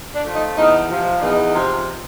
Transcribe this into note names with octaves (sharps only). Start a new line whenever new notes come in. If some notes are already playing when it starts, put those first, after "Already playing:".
D4
F3 A3
D#4
E2 D#4
C3 F3
E2 D#4
C3 F3